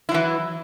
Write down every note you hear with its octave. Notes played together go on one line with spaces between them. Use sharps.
E3 F#3 E4